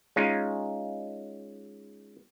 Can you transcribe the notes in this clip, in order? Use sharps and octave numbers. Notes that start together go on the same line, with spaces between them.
G#3 C#4 D#4 F4